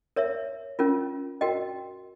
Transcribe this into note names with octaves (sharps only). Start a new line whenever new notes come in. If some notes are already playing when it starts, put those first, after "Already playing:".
A#4 C#5 E5
C#4 F4 A#4
F#4 A#4 D#5 G5